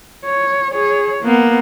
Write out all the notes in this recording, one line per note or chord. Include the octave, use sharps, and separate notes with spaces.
C#5
G#4 C#5
A#3 B3